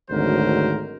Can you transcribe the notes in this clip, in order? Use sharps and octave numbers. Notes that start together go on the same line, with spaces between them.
G#1 D2 F#3 A#4 C5